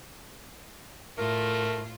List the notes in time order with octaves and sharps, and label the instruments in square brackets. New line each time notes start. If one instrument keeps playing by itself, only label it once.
[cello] A2 F4 [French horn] A3 [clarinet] A#4